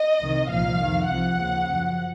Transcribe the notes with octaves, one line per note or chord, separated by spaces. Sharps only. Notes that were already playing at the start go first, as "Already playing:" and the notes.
Already playing: D#5
C2 C3 D#3
C2 A#2 F3 F5
F2 D#3
C2 C3 F3 F#5
D#2 C#3 F3
F#2 F3